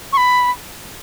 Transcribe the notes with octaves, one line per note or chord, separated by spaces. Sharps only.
C#6
B5